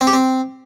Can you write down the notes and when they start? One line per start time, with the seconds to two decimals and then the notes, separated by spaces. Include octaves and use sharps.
0.01 C4
0.07 G4
0.13 C4